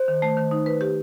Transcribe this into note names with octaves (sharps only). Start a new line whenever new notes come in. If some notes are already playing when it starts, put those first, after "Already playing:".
Already playing: C5
D#3
A3
D#3
D#4
B4
G4